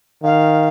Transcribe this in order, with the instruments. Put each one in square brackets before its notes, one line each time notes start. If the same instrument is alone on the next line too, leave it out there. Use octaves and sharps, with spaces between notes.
[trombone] D#3 [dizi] F5